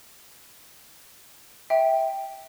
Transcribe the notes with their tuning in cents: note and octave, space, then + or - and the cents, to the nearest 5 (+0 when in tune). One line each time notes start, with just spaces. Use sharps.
E5 -15 G5 +0